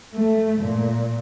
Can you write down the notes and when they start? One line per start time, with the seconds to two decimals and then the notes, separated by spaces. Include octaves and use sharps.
0.14 A3
0.62 A#2